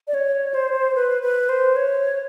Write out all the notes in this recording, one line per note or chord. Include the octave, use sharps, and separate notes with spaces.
D5
C#5
C5
B4
B4
C5
C#5